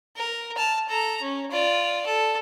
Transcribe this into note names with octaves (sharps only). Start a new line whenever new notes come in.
A#4
A5 F6
A4 A#5
C#4
F4 D5
A4